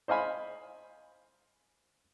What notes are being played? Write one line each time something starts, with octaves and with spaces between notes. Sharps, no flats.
C5 D#5 F5 G#5 B5